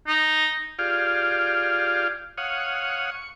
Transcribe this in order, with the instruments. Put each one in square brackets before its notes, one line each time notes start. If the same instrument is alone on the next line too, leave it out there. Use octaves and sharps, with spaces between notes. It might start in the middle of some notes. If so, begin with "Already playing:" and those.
[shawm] D#4
[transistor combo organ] F4 G4 G#4 D5 F5
C#5 F5 F#5 D#6
C#6